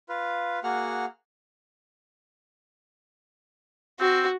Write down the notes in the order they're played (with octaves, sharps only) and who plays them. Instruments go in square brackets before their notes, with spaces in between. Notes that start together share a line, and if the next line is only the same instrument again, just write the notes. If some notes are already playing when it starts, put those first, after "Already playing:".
[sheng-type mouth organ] F4 B4 F5
A#3 F#4 G#4 F#5 F6
[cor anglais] C4 [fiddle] F#4